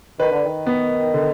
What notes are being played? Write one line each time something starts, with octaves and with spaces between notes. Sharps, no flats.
D#3 B4
D3
D#3
B3
D3